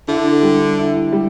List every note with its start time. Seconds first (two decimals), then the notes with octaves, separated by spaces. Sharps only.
0.08 D3 E4
0.43 G3
0.78 E4
1.12 G3